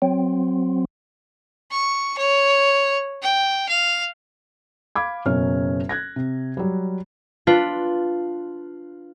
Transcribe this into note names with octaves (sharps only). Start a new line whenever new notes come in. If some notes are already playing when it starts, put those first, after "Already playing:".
F#3 C4
C#6
C#5
G5
F5
F5 B5 D6 G#6
F#1 B2 F#3 C#4 C#5 F6
F#6 G#6 A#6
C3
F#3 G3
D4 F4 B4